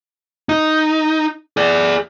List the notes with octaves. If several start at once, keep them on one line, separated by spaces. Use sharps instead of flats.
D#4
G#4 D5